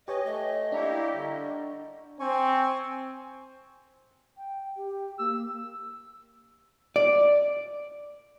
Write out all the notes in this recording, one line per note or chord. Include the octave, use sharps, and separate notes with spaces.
G4 B4 C#5 D#5 G#5
A3 D#5
A#3 D4 E4 G4 A#5 C#6
D3 G3
C4 G#5 C#6
G5
G4
A#3 E6
D5